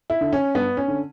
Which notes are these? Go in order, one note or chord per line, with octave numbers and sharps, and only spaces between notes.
E4
D3
C#4
G2 B3
C#4
D3